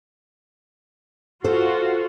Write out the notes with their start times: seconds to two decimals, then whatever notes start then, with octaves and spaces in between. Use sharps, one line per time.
1.44 F4 F#4 A4 C5